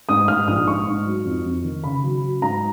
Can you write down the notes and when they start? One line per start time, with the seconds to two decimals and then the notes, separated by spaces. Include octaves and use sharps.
0.09 G#2 D#6
0.28 G#2 F6
0.47 A#1 D#6
0.66 G#2 C#6
0.87 G#2
1.05 F#3
1.25 F2
1.45 F2
1.64 D#3
1.84 C#3 B5
2.03 F#3
2.22 F#3
2.42 G#2 A#5